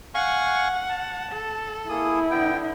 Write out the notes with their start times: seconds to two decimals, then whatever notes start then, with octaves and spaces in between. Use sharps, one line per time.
0.15 F5 F#5 G#5 C#6
0.89 A5
1.32 A4
1.89 A#3 E4 G#4 D#6
2.30 D3 B3 G5